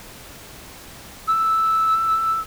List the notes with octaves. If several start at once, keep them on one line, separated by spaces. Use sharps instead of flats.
E6